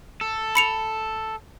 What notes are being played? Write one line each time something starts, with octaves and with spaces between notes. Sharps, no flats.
A4
B5 C#7 F7